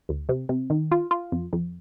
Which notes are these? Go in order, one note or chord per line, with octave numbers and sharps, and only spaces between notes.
D2
C3
C3
D#3
F4
F4
F2
F2